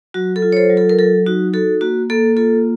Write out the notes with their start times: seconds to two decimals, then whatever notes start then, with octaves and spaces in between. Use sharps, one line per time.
0.14 F#3 F#4
0.36 A4
0.42 F4
0.52 C#5
0.57 A4 C5
0.70 F#3
0.77 A4
0.89 A#4
0.99 F#3 A4
1.26 D#4 F#4
1.53 F#4 A4
1.81 A#3 F#4
2.10 A#3 A4
2.37 F4 A4